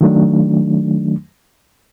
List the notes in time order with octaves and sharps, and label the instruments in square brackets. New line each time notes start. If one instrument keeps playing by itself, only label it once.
[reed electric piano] D#3 F#3 A3 D4